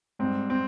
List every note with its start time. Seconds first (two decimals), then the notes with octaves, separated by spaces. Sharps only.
0.19 G#2 G3 C4
0.50 C4